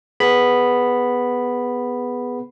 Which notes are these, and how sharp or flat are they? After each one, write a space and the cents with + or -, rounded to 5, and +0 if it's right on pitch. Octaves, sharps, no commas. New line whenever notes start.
B3 +0 G#4 +0 B5 +0